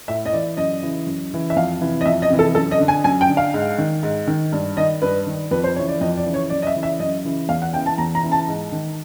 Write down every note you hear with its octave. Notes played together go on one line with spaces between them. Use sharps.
A2 E5
D#5
E3 D5
F#2 D#5
C#3 E3
F#2
C#3 E3
E5
F2 F5
C3 E3
D#5
F2 E5
D#5
C3 E3
A4
F#2 A4
D#5
D3
G#5
F#2 G#5
G5
D3
F5
G#2
D#3
G#2
D#3
G2
D#3 D#5
G2 B4
D#3
F2 B4
C5
C#3 E3 C#5
D5
F2 D#5
D5
C#3 E3
C#5
F#2 D5
D#5
E5
C#3 E3
E5
F#2 D#5
C#3 E3
E2 F5
F#5
C#3 E3 G5
A5
E2 A#5
A#5
C#3 E3
A5
G#2
D#3